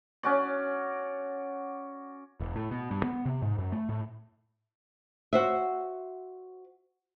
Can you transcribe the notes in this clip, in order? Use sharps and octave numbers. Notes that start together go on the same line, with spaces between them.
C#4 F#4 D5
E1
A2
B2
G2
B3
C3
G#2
F#2
A3
A2
F#4 C5 E5